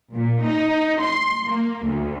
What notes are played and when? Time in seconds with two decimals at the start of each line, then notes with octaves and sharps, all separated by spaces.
0.14 A#2
0.44 D#4
1.01 C6
1.47 A#3
1.85 D2